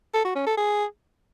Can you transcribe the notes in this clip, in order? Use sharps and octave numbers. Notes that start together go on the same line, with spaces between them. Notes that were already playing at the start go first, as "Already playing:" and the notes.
A4
F#4
C#4
A4
G#4